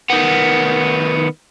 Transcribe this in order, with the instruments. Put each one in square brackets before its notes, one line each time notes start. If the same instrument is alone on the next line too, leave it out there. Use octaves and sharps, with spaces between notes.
[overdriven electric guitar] D#3 B3